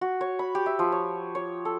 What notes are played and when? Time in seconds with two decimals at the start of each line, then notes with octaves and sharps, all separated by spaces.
0.01 F#4
0.21 C#5
0.39 B5
0.55 G4
0.66 E5
0.79 F3
0.92 C#5
1.35 C#5
1.65 A4